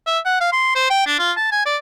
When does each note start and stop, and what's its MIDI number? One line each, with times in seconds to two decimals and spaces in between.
0.07 0.19 76
0.25 0.40 78
0.41 0.51 77
0.52 0.74 84
0.76 0.88 72
0.90 1.05 79
1.07 1.16 62
1.19 1.32 65
1.37 1.49 81
1.52 1.65 80
1.66 1.77 74